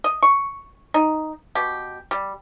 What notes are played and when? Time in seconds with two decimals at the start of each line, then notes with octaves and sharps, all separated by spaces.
0.04 D#5
0.23 C#6
0.94 D#4
1.55 B2 G4
2.11 G3